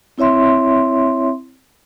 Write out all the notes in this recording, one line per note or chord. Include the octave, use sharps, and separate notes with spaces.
C4 E4 C#5 E5 C6